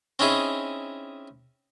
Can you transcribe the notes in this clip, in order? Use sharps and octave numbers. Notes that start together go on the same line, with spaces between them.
C4 C#4 D#4 E4 G#4